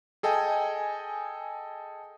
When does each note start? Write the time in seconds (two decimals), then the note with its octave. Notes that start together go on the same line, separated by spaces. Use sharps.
0.23 G#4 A4 D#5 G5 G#5